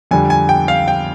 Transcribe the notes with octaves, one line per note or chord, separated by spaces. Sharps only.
F2 D3 G3 G#5
G#5
G5
F5
G5